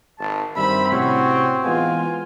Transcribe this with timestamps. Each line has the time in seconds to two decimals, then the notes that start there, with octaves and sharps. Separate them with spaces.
0.19 G#1 A5
0.57 G2 D#3 G3 C4 C5 E5 B5
0.92 A2 C3 C#4 F#4 C#5
1.64 E3 G#3 B3 F4 G#5